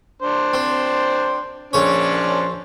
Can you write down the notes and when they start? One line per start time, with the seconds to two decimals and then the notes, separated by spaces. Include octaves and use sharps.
0.22 D4 C5
0.53 C4
1.73 A#1 C#4 D4 C5 C#5